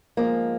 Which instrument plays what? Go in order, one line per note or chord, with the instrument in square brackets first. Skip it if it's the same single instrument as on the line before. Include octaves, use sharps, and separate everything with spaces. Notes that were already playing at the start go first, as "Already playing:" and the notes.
[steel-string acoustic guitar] G#2 F3 G#3 A#3